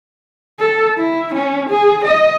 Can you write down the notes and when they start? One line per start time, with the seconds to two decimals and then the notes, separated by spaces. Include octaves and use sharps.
0.59 A4
0.97 E4
1.34 C#4
1.69 G#4
2.04 D#5